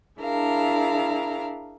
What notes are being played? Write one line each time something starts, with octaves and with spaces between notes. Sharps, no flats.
D4 E4 G#4 A#4 F5